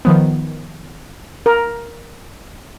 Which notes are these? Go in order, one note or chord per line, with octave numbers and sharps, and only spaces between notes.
D#3 F3 B3
A#4